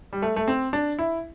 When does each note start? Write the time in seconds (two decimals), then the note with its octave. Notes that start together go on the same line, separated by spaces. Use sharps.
0.13 G3
0.22 A3
0.36 A3
0.48 C4
0.73 D4
0.99 E4